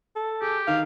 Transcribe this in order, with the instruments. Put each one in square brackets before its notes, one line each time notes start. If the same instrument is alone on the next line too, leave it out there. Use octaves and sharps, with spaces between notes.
[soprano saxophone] A4
[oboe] G4 [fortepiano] G#4
[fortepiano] D#3 [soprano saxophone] F5